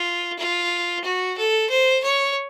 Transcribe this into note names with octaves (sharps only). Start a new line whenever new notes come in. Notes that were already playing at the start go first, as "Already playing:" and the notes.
Already playing: F4
F4
F#4
A4
C5
C#5